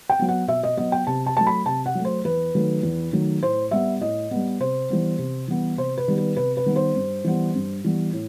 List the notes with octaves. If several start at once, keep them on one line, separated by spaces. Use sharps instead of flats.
G5
F#3 B3
F#5
B2 E5
D#5
F#3 B3 D#5
G5
C3 A5
A5
F#3 A3 A5
B5
C3 A5
F#5
F#3 A3
C5
E2 B4
D#3 F#3 A3
E2
D#3 F#3 A3
A2 C5
G3 B3 E5
A2 D#5
G3 B3
C3 C5
E3 G3 B3
C3
E3 G3 B3
C3 C5
B4
D#3 G3 B3
B4
C3 B4
B4
D#3 G3 B3
C5
G2
E3 G3 B3
G2
E3 G3 B3
A2